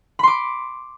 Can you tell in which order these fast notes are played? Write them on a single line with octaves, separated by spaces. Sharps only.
B5 C6 D6